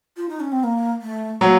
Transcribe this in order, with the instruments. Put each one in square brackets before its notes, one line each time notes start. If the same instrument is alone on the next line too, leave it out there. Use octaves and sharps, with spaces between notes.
[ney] F4
D#4
C#4
C4
A#3
A3
[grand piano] F#3 [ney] A#3